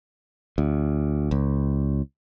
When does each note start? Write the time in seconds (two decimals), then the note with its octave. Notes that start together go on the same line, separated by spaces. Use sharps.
0.58 D2
1.31 C#2